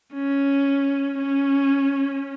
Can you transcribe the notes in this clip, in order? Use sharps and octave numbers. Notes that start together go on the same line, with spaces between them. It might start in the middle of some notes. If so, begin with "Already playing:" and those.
C#4
C#4